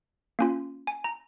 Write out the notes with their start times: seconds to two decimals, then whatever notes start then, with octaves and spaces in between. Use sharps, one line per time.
0.39 A#3 C#4 F4
0.87 G#5
1.04 A#5